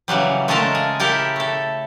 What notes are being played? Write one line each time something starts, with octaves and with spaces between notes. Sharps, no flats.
C#3 E3 F#3 G3
G#3 A3 C#4 F4 A4 A#4
G#4
E4 G4 A4 A#4
A3 A4